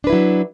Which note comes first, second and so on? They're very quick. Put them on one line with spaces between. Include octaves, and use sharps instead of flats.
D4 B4 E4 F#3